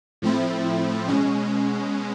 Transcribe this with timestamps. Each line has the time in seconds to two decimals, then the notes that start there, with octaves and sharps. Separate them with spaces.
0.22 A2 F3 A3 C4 E4
1.08 B2 G#3 C#4